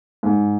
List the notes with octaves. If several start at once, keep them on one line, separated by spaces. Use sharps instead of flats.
G#2